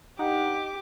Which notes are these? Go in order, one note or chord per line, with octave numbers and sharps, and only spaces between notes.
G2 D#4 G4 F#5 D6